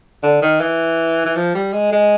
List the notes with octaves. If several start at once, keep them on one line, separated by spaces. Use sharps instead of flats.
D3
D#3
E3
E3
F3
G3
G#3
G#3